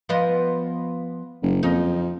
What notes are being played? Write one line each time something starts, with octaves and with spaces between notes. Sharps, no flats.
F3 B3 D#5
F#1
F2 D#4